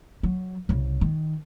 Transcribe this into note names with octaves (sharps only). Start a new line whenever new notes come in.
F#3
C2 C#3
D#3